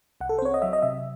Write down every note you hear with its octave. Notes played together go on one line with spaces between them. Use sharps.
C2 F#5
A4
C5
C4 C#5
D#5
F#3 E5
D#5
C3 E5